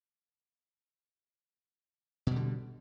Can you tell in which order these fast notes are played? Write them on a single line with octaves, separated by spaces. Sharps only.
B2 G3 D3